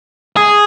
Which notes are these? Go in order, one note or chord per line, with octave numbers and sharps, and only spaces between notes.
G#4